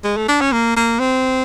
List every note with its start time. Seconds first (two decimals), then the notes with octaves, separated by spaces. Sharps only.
0.04 G#3
0.17 A3
0.28 D4
0.41 C#4
0.52 A#3
0.76 A#3
1.00 C4